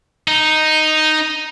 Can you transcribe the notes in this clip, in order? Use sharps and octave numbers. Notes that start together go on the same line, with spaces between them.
D#4